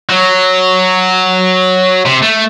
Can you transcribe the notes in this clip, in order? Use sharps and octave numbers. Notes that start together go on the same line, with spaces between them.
F#3
C3
A3